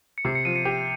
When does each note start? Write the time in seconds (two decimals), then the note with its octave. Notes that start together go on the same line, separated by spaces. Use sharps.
0.18 C#7
0.25 C3 C7
0.35 C#7
0.45 F3 D#7
0.56 C#7
0.65 G4 D#7